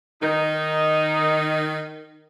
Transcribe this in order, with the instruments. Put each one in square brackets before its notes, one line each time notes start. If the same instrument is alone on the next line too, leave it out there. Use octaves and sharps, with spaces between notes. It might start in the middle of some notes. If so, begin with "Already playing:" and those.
[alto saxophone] D#3 [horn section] D#4 [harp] A#4